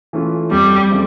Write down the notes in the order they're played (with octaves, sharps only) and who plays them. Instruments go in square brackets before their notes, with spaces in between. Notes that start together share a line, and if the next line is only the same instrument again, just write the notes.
[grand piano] E3 A3 C#4 F4
[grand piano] F2 [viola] G3
[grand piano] C#3 F3 A3 C4